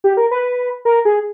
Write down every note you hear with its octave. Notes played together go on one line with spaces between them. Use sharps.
G4
A#4
B4
A#4
G#4